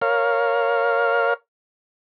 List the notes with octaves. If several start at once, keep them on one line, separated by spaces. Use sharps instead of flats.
A#4 C#5 F5